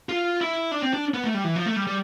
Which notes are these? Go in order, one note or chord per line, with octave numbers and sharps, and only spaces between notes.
F4
E4
D4
C4
D4
B3
A3
G3
E3
F3
A3
G3
G3